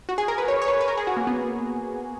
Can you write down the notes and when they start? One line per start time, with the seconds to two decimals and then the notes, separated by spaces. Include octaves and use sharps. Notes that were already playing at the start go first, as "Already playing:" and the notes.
0.09 F#4
0.18 G#4
0.28 A#4
0.38 B4
0.48 C#5
0.62 C#5
0.68 B4
0.81 B4
0.88 A#4
0.97 G#4
1.07 F#4
1.17 A#3
1.27 B3